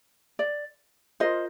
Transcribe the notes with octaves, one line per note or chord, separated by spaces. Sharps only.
D5
F4 A#4 C5 D#5